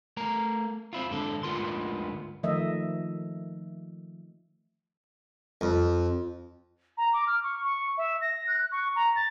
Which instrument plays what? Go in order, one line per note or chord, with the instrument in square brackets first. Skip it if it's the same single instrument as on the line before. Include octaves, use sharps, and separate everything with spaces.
[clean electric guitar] A3 A#4 A#5
C4 E4 F4
G#2 D3 A4
D2 G#2 B3 F4 A#4 C6
[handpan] D#3 F3 A3 D#5 E5
[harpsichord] F2
[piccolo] A#5
D6
F6
C#6
C#6
E5
A#6
F#6
C#6
A#5
A6